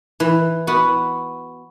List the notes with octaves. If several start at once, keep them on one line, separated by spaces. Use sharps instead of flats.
E3
B3 F#4